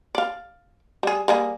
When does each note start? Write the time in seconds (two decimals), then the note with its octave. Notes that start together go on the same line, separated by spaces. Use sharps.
0.15 D5 F5
1.03 G3 G#4
1.28 G3 A#3 G#4